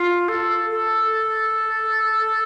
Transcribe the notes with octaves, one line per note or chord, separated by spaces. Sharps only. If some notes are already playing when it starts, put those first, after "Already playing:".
Already playing: F4
A4
A4